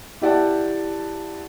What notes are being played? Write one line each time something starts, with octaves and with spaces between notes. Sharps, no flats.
E4 G4 D5 F#5 G5 A5